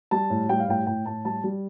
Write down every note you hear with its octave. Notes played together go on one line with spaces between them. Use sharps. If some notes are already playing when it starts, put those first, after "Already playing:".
G3 A5
A2
G3 G5
F5
A2 G5
A2 G5
A2 A5
G3 A5
G3